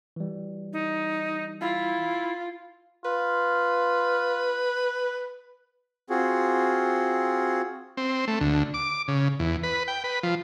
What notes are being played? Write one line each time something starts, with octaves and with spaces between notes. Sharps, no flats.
E3 G3
D#4
E4 F4
F4 B4
C4 F4 F#4 G#4
C4
A3
D2
D6
C#3
E2
B4
G5
B4
F3